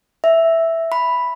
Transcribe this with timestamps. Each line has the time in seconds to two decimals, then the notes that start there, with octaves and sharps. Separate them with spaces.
0.24 E5
0.92 B5